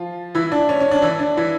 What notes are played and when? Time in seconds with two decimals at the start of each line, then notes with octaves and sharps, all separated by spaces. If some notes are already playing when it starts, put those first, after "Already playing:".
Already playing: F3 F4
0.35 E3 E4
0.52 D4
0.69 C#4
0.80 C#4
0.91 D4
1.02 E3 E4
1.19 D4
1.37 E3 E4